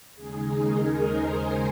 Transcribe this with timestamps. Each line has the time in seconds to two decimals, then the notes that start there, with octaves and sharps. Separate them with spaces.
0.14 D#2 C#3 G#3 D#4 G#4
0.61 A#4
1.07 C5